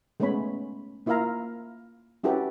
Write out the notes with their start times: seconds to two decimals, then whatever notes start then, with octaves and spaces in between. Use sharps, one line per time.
0.20 G#3 A3 B3 C#4 C#5 B5
1.06 A#3 E4 F4 E5 F5 A#5
2.24 C#4 E4 F#4 G4 A4 B4